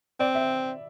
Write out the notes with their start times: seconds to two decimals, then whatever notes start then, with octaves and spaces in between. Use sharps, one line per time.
0.20 C4 D5
0.35 E5